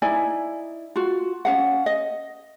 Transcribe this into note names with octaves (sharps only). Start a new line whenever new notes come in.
D#4 E4 D5 G#5
F4 F#4
C#4 F5 F#5
D#5